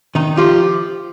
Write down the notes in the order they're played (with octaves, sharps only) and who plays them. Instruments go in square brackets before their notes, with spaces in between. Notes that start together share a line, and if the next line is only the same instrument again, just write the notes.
[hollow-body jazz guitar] D#3 D#4
[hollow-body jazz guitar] F3 F4 [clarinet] G4